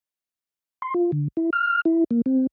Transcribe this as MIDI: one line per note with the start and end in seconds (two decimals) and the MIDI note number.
0.82 0.94 84
0.94 1.11 65
1.12 1.28 50
1.37 1.50 64
1.53 1.81 89
1.85 2.04 64
2.11 2.21 58
2.26 2.47 60